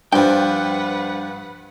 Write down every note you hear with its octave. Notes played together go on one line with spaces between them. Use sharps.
G2 F3 D4 B4 C5 F#5 G5